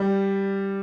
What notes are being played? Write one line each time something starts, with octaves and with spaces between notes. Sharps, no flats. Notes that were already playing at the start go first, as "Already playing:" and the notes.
Already playing: G3